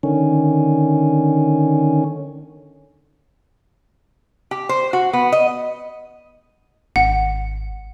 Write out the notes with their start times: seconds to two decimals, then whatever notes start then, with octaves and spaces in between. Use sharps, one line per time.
0.03 D3 D#3 C#4
4.51 G4
4.69 C5
4.93 F#4
5.13 B3
5.32 D#5
6.96 G#1 F#5